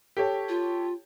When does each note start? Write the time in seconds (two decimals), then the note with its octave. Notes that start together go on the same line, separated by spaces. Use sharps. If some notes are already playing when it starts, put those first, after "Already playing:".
0.17 G4 A4 C#5
0.49 F4